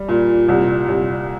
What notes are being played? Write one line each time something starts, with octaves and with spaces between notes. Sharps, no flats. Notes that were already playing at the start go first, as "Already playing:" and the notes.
Already playing: G3
A#2
C2
C2